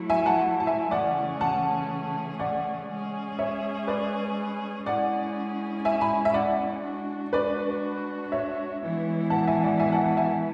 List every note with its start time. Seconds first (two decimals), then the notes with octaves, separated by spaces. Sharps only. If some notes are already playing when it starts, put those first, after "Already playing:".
Already playing: F#3 A3 E4
0.10 E5 G#5
0.26 F#5 A5
0.60 A5
0.67 E5 G#5
0.91 C#3 E3 A3 C#4 G#4 D5 F#5
1.41 F#5 A5
2.39 D5 F#5
2.89 G#3 C#4 G#4
3.39 C#5 E5
3.87 B4 D5
4.86 G#3 C#4 E4 G#4 D5 F#5
5.85 E5 G#5
6.01 G#5 B5
6.25 E5
6.34 D5 F#5
6.84 G#3 D4 F#4
7.33 B4 D5
8.32 C#5 E5
8.81 E3 G#3 B3 E4
9.30 F#5 A5
9.48 E5 G#5
9.64 D5 F#5
9.80 E5 G#5
9.92 F#5 A5
10.04 F#5 A5
10.17 E5 G#5